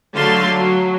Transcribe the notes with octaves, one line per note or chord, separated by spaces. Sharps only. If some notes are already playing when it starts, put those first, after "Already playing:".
D3 F#3 A3 F5 A5 C6
F#3